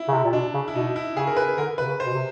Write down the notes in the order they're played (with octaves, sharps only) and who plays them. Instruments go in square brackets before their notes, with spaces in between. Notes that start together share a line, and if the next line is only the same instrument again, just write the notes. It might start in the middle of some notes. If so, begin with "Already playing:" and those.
Already playing: [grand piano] E4
[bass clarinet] C#3
C3
A#2
[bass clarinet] B2 [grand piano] D4
[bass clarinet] C#3
[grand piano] E4
[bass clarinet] B2 [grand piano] D#4
[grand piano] E4
[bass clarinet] C#3 [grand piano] G#4
[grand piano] A#4
B4
[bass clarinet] D3 [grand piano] A#4
[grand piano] B4
[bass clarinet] C3
C#3
[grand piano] C5
[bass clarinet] B2
C3